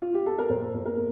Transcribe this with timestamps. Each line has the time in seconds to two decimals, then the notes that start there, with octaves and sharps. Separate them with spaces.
0.02 F4
0.14 G4
0.26 A4
0.38 A#4
0.49 A#2 C5
0.74 A#2
0.85 A#4
0.97 A#3